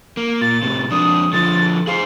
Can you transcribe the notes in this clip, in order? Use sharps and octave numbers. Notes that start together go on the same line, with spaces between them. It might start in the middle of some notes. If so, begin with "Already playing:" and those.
A#3
A#2 A6
A2 C3
F2 D4 D#6
D3 F3 A6
G#4 C5 F5